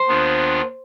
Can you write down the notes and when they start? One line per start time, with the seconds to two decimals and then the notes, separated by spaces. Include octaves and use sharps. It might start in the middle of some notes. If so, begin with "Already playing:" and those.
Already playing: C5
0.08 D#2 D#3 B3 D4 F4